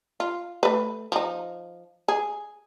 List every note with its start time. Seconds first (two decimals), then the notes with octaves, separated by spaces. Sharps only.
0.20 F4
0.63 A3 B4
1.12 F3 D#4
2.08 G#4